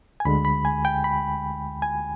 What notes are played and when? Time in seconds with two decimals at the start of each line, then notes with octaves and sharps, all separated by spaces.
0.20 G#5
0.25 D2 D3 G#3 B5
0.45 B5
0.65 G#5
0.85 G5
1.04 B5
1.82 G#5